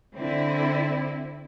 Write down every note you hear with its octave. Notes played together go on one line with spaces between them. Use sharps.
D3 C4 E4